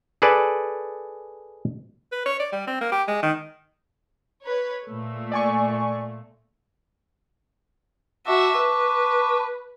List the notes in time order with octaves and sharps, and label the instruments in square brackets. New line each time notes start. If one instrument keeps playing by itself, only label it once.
[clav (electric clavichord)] G#4 A4 B4 D5 G#5
[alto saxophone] B4
C#5
D5
G3
C4
A#3
G4
G#3
D#3
[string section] B4 C#5
A#2 A3
[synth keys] D5 G#5 C#6
[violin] F#4 E5 [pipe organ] A5 C#6 D6
[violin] B4